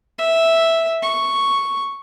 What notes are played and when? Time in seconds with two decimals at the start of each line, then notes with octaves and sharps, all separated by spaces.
0.18 E5
1.02 C#6